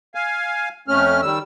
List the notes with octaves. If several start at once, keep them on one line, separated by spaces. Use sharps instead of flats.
F5 G#5
F2 A3 C#4 F6
D#3 G3 E6